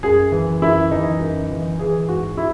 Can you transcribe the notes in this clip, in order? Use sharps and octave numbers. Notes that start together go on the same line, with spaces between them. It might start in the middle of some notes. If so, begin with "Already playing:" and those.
F#2 G#4
E3
F#2 E4
E3 D#4
F#2
E3
E3 G#4
G#2 F#4
E4